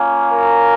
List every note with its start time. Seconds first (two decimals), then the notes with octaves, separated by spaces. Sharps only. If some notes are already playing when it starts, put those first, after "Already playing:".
Already playing: A#3 C#4 F4
0.28 A#4